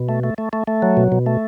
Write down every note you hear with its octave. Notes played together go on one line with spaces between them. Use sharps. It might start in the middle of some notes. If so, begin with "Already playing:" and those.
Already playing: B2
A3
A3
A3
A3
A3
F#3
B2
B2
A3